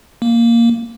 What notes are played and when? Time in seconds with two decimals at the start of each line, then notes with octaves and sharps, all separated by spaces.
0.22 A#3